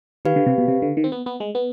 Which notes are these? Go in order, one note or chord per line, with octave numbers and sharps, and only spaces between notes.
D#3 G4 B4 F5
D3
C3
B2
C3
D3
D#3
C4
B3
B3
G#3
B3